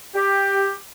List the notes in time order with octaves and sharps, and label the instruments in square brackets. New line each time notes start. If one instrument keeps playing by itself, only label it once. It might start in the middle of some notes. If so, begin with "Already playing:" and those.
[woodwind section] G4